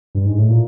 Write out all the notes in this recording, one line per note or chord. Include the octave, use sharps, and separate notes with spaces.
G2
G#2
A2
A#2